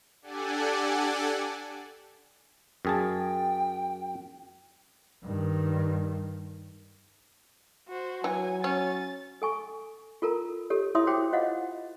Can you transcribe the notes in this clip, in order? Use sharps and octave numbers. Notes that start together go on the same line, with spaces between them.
D4 G4 A4 D5 F#5 G#5
F#2 G#4 G5 A5
G2 D#3
F#4 C5
E3 F#3 G#5
C#4 A6
A4 G#5 C#6
F4 A4 A#4 A#5
G4 A4 C#5
E4 C#5 E5 C6 D#6
F#4 C5 C#5 G5 C6 D6
F4 C5 C#5 D#5 F5 F#5